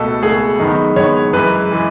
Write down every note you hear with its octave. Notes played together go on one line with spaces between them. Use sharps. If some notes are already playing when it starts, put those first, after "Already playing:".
Already playing: C#2 B2 A3 A4
C#2 B2 A3 G#4
F#2 D#3 G#3 B3 D#4
F#2 D#3 G#3 B3 C#5
F#2 E3 G#3 B4
E3 G#3